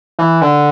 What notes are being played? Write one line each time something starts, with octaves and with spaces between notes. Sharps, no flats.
E3
D3